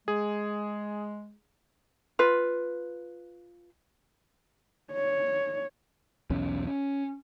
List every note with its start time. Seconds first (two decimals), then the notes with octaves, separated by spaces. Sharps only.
0.08 G#3 G#4
2.19 F4 B4
4.93 C#5
6.30 B1 E2 C#4
6.67 C#4